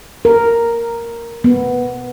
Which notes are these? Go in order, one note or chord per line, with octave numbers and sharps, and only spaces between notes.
A#4
B3